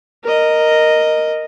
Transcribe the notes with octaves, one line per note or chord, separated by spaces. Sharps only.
A#4 D#5